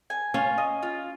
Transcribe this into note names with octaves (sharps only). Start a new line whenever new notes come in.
G#5
C#4 F4
D#5
F4